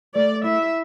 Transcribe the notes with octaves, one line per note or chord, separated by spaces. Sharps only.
A3 D5
E4 E5